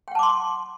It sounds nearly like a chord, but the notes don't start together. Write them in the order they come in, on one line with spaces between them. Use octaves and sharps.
G5 F#5 A5 D6 C6